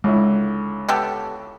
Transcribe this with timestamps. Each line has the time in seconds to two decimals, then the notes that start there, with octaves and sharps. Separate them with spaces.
0.04 C#2 D3 G#3 E4
0.89 B3 G4 A4